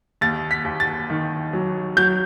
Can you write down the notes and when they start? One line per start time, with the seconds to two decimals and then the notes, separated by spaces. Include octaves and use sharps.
0.21 D#2 A6
0.51 B6
0.65 D#2
0.80 A6
1.10 D#3
1.53 F#3
1.97 F#3 G6